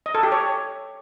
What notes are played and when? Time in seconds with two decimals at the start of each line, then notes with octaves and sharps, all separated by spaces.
0.06 D#5
0.15 A4
0.23 G4
0.32 C#5